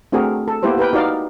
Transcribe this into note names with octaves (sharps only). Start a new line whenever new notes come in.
A3 C4 D4 F#4 G#4 A#4
A4
A#3 B3 E4 G4 B4 C5
G4 A#4 B4 G5
D#4 F#4 A#4 D5 F5